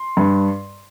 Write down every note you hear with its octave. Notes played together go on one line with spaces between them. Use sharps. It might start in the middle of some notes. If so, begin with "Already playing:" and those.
Already playing: C6
G2